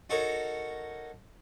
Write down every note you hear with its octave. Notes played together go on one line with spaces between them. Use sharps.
D#4 F#4 A4 A#4 C#5 A#5